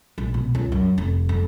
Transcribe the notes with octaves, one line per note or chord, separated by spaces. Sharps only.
A#1
B2
C#2
F#2
F1
F2